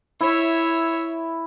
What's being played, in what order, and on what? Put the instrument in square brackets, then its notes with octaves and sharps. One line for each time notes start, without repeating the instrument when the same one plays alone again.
[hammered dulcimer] E4 [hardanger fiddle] C#5 E5